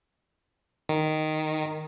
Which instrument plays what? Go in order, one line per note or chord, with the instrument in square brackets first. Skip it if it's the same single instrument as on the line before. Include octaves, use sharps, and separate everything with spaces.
[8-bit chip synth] D#3